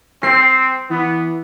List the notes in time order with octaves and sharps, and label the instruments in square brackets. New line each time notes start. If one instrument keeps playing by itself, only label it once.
[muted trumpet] C4 [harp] C7
[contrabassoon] E3 [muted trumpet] B3